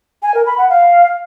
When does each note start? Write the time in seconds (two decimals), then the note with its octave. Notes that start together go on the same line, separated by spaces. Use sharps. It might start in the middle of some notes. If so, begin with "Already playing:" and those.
0.23 G#5
0.34 A#4
0.46 B5
0.58 F#5
0.70 F5